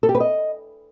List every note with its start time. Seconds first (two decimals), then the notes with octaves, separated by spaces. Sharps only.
0.03 A4
0.09 G4
0.15 B4
0.20 D#5